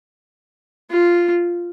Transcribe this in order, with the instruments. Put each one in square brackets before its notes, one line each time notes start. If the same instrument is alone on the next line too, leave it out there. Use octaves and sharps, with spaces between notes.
[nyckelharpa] F4